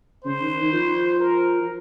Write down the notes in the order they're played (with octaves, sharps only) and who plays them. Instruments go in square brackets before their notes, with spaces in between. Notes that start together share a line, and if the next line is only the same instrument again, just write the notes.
[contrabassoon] C#3 [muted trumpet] C5
[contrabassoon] D#3
D#3
F3
[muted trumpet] A#4
[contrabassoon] F3